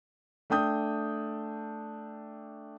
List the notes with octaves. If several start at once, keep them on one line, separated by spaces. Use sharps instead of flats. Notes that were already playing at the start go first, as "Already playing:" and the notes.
A3 D4 G5 D#6 G6